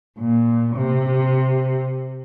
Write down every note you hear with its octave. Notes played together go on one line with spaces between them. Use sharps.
A#2
C3